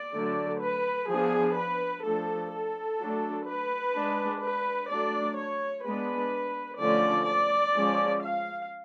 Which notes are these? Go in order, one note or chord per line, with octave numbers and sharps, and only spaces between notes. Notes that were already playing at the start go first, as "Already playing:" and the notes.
Already playing: D5
D3 F#3 A3
B4
F3 B3 D4 G#4
B4
F3 A3 D4 A4
A4
F#3 A3 D4
B4
G#3 D4
B4
F#3 A3 D4 D5
C#5
G#3 B3 D4 B4
D3 F3 A3 C#4 D5
D5
F3 G#3 C#4
F5